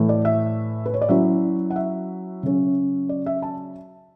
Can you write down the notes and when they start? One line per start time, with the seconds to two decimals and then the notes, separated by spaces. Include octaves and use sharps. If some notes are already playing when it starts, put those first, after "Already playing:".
Already playing: A2 E3 A3
0.09 D5
0.25 E5
0.86 B4
0.94 C#5
1.01 D5
1.09 F#3 C#4 E4 E5
1.70 F#5
1.76 E5
2.43 C#3 F#3 C#4
3.09 D5
3.26 E5
3.42 A5